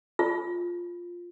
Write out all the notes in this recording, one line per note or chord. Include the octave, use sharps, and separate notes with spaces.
F4